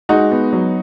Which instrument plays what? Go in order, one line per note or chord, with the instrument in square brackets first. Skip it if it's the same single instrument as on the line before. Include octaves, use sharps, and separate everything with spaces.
[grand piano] G#3 D#4 F#4
B3
F#3